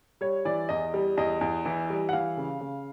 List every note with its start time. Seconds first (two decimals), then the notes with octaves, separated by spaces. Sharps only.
0.21 G3 C#5
0.45 E3 D5
0.69 E2 D#5
0.94 G3
1.17 E2 D#5
1.41 E2
1.65 E3
1.90 G3
2.09 F#5
2.13 E3 F5
2.37 C#3
2.61 C#3